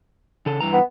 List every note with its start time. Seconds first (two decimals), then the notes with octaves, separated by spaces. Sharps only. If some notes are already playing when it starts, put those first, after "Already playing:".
0.46 C#3 A4
0.60 G2 E3 A#5
0.73 B3